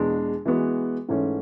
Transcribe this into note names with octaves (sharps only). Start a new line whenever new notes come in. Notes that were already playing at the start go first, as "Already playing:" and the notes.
Already playing: E2 B2 G#3 D4
E3 G#3 B3 F#4
G#2 E3 A3 C#4